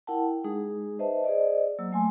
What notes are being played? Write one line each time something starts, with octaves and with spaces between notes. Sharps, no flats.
E4 A#4 F#5 G5 A5
G#3 D#4 G#4
B4 C5 D#5 E5 A5
G#4 C5 D5 D#5
F#3 A#3 E6
A3 G#5 C6